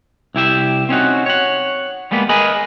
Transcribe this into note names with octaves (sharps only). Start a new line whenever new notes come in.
C2 E4 G4 E5
C4 C#4 D#4 F#4
C#5 F#5
G3 G#3 A#3 B3
G#4 A#4 B4 D#5 G#5